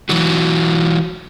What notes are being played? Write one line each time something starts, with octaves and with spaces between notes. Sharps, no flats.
E3 F#3 F#4